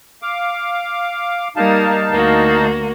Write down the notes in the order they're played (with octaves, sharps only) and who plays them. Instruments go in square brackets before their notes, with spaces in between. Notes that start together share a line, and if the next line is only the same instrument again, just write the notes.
[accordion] F5 D6
[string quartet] G3 A#3 [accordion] D#4 F5 A5
[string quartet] D2 A#3 F#4